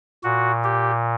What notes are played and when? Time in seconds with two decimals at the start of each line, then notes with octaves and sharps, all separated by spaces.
0.24 A#2 F#4
0.64 G4